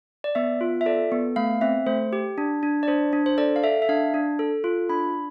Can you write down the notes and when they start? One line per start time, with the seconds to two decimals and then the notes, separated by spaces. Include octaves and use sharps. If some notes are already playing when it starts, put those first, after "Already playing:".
0.24 D5
0.35 B3 E5
0.61 F4
0.81 E5
0.86 A4 D5
1.12 B3
1.36 A3 F5
1.61 C4 E5
1.86 A3 C5
2.13 G4
2.38 D4
2.63 D4
2.83 D5
2.88 D4 C5
3.13 D4
3.26 C5
3.38 A4 D5
3.56 F5
3.64 A4 E5
3.82 E5
3.89 D4 F5
4.14 D4
4.39 A4
4.64 F4
4.89 D4 B5